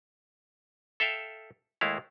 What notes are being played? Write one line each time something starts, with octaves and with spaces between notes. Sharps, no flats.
A4 E5 F5 G5
D#2 G#3 A3 E4 F5